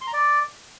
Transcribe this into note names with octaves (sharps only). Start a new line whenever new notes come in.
C6
A#5
D5